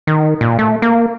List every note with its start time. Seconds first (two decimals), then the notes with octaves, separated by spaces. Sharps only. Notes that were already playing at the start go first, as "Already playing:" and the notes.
0.07 D#3
0.41 A#2
0.59 A3
0.82 A#3